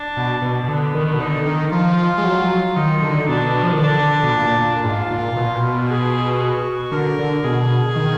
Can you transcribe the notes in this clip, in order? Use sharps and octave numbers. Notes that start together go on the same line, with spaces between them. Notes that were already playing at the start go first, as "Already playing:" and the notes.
Already playing: D4
B2
B2
B2
D3 B3
D#3
B2
D3 D#4
D#3
F3 F4
G#3
F#3
D#3 D#4
D3
B2 D4
F3
D#3
D3 D4
B2
A#2
A#2
A#2
A#2
G#2 F4
A#2
B2
A#2
B2
G#4
F#4
D3 A#4
D3
B2 G#4
D#3